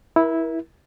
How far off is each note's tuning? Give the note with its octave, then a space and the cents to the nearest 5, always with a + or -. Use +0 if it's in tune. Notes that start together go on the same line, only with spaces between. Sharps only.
E4 -10 A#4 +35